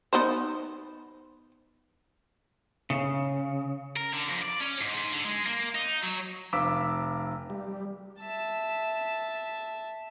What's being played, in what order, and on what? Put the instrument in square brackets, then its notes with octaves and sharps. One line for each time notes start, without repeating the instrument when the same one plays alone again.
[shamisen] B3 D#4 C5
[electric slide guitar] C#3
[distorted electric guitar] A#4
D3
F2
D5
C#4
G#2
G#2
D3
G#3
A#3
D#4
F#3
[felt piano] F1 F5 D6 E6 B6
[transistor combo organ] G3
[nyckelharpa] E5 A5